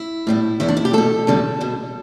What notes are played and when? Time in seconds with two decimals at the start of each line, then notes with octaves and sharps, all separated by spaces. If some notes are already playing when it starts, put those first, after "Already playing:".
Already playing: E4
0.27 A2 G3 B3
0.60 E2 E3 B3 E4
0.68 D4
0.77 E4
0.85 G4
0.93 B2 A3 A4
1.27 E2 D3 G3
1.61 B2 B3